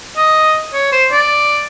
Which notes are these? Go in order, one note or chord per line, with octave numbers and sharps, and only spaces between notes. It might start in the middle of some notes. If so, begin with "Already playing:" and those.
D#5
C#5
C5
D5